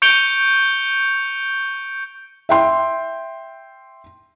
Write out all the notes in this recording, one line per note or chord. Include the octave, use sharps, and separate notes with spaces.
C#6 G6 C#7 D7 F7 G7
E5 G5 C6